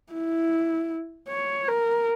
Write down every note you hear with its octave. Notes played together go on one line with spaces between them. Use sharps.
E4
C#5
A#4